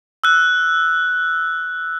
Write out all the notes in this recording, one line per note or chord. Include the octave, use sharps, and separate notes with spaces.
E6 F#6